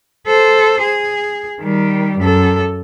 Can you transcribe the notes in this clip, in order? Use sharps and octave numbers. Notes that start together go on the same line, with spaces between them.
A4 C5
G#4
D#3 G3
F#2 A4